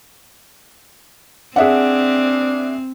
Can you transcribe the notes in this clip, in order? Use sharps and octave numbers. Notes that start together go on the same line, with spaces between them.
C4 D4 G#4 E5 F#5